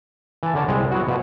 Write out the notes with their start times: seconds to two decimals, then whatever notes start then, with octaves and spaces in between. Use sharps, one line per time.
0.43 E3 A5
0.55 D3 A#4 C#5 A5
0.68 C2 G3 G#3
0.92 F#3 B3 E4 F#4
1.08 B2 F3